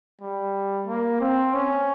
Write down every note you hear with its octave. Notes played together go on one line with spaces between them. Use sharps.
G3
A#3
C4
C#4